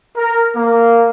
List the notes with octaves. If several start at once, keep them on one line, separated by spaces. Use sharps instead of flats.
A#4
A#3